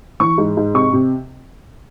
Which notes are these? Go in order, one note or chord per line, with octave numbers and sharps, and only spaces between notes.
E3 C#6
G#2
G#2
C3 C#6
C3